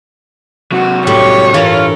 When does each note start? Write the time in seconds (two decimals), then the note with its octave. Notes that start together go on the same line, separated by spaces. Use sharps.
0.72 C3 F#3 F#4
1.07 A2 G3 G4 C#5 C#6
1.54 G2 E3 D4 F4 A4 A#4